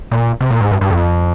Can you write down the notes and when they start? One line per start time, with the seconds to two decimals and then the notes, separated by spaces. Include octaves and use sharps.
0.12 A#2
0.41 C3
0.50 A#2
0.61 G#2
0.71 G2
0.81 G2
0.90 F2